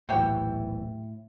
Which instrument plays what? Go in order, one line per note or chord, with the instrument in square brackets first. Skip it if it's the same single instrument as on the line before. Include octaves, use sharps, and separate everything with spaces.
[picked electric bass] D#1 B1 E3 [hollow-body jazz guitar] A2 [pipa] F#4 G4 G5